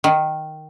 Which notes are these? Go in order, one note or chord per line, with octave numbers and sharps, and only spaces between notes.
D#3